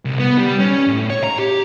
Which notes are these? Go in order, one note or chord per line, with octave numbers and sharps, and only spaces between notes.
C2
B3
G3
C#4
A2
C#5
A#5
G4